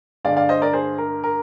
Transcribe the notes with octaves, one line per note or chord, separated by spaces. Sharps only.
G2 D3 G#3 D5 F5
D5 F5
C5 D#5
A#4 D5
G#4 C5
A#4
A#4